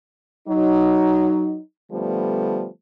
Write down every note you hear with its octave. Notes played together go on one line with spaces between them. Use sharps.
F#3 D#4
D3 F3 G3 A3 B3